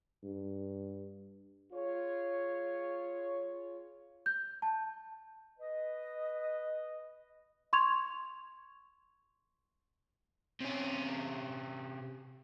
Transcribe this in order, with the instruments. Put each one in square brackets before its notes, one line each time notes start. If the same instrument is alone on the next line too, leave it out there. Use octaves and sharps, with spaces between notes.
[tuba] G2
[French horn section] F4 G#4 C#5
[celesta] G6
A5
[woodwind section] B4 D#5
[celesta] C6 C#6 G#6 F7
[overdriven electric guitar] C3 C#4